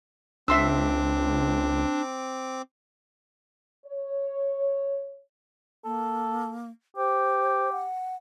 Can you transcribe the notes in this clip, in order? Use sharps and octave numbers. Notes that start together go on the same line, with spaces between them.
C#2 C4 D4 E5 C6 D6 E6
C#5
A#3 A4
G4 C5
F#5